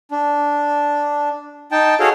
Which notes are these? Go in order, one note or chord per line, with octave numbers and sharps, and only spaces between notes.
D4
D#4 G5 A5
F#4 G#4 A4 C#5 F5